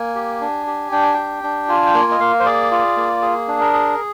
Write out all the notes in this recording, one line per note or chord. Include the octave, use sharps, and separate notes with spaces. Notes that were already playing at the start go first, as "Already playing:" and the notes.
Already playing: A#3 G#5
G4
D4
G4
D4 G5
G#5
G4 G5
D4
F4 G#5
G5
A#3 G#5
D#5
A#3 F5
C5
G#4 D5
F4
A#3
G#4
D4
A#4
G#4